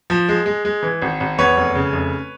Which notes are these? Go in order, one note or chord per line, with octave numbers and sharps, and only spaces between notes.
F3
G#3
G#3
G#3
E3
G#1
G#1
E2 B4 C#5
F1
C#3
F1